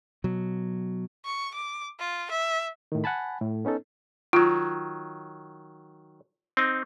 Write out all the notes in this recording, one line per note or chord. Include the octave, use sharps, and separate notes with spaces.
B2 F#3
C#6
D6
F4
E5
A2 D#3
F#5 G#5 A5 B5
A2
B3 C#4 D#4 A4
D#3 F#3 F4
C4 D#4